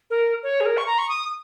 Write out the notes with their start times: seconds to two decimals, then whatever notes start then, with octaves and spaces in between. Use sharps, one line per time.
0.10 A#4
0.43 C#5
0.61 G#4
0.66 A#4
0.77 C#6
0.87 A#5
0.98 C#6
1.09 D#6